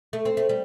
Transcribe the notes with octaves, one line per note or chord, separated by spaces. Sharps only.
A3
C4
A3
G3